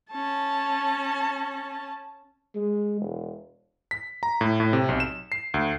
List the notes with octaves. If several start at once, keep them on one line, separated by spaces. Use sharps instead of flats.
C#4 A5
G#3
E1
B6
A#5
A2
A2
C3
B1
E7
C7
D2